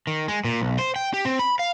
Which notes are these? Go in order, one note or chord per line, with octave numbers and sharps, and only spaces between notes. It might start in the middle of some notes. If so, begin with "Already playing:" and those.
D#3
G#3
A#2
B1
C5
G5
G4
C4
B5
F5